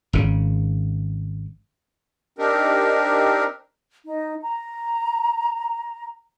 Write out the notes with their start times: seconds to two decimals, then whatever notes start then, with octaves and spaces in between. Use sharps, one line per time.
0.13 G#1 C#3
2.39 C4 D4 D#4 G4 A#4
4.05 D#4
4.41 A#5